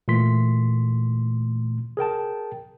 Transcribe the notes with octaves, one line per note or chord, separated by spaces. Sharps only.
A#2 E3 A3 C6 B6
G#4 A#4 G5 A5